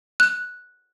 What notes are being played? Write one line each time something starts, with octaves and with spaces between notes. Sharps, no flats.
F#6